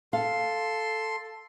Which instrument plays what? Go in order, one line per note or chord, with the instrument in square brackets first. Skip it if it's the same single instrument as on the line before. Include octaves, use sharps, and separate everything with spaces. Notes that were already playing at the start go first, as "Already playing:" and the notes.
[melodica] A4 C6 [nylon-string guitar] F5